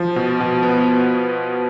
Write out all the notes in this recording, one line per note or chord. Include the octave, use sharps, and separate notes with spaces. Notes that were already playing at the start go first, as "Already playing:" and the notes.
Already playing: F3
B2
B2
B3